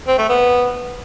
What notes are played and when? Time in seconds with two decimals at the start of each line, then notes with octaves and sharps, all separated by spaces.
0.07 C4
0.18 A3
0.29 B3